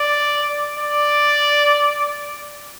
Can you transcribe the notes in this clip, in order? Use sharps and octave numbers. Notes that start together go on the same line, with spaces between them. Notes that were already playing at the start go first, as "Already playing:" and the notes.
Already playing: D5
D5